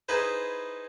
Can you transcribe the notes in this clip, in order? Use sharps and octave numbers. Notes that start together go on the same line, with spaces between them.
D#4 E4 G#4 B4 C5